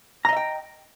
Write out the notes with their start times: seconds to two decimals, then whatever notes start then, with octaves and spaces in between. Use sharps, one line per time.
0.25 A#5
0.29 D#5
0.33 E5
0.37 G5